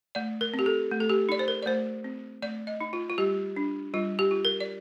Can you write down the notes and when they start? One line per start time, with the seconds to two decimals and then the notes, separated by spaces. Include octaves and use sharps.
0.15 A3 D5
0.41 A#4
0.54 C4
0.59 G4
0.66 A4
0.91 A3
1.00 A4
1.10 G4
1.29 D#4 D5
1.39 C5
1.48 A#4
1.63 D5
1.66 A3 C5
2.04 C4
2.42 A3 D5
2.67 D#5
2.80 D#4
2.93 F4
3.10 F4
3.18 G3 G4
3.56 D4
3.94 G3 F4
4.19 G4
4.31 F4
4.45 A#4
4.60 D5